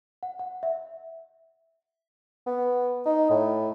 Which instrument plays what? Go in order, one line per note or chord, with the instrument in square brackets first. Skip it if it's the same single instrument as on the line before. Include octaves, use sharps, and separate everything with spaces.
[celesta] F#5
F#5
E5
[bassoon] B3
D#4
A2